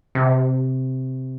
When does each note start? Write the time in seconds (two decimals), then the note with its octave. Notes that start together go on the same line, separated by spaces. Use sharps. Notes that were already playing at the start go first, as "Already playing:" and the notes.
0.15 C3